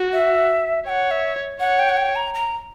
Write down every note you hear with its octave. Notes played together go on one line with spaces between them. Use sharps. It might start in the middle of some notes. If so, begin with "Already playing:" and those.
Already playing: F#4
E5
C#5 F#5 G5
E5
C#5 F#5
G5
F#5
G5
A#5
A#5